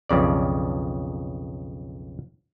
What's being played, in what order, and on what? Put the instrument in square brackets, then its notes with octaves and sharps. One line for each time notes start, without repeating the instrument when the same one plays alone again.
[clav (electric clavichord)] B1 F2 C#3 D5